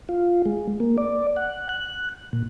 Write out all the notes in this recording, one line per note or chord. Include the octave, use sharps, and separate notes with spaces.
F4
G#3
A#3
D5
F#5
F#6
A#2